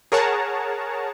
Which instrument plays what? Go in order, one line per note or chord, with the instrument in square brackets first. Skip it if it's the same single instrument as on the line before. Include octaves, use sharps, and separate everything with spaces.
[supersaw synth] G#4 A#4 C#5 F#5 A5 A#5